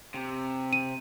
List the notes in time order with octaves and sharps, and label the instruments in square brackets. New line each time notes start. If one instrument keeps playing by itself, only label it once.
[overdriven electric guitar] C3
[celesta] D#7